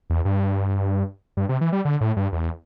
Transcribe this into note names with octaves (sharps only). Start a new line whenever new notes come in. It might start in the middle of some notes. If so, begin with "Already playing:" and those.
E2
G2
G2
C3
E3
G3
D3
A2
G2
E2